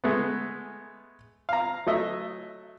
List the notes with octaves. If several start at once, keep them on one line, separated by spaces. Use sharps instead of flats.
G#3 A3 B3
F5 A#5
F#3 A3 D#5 E5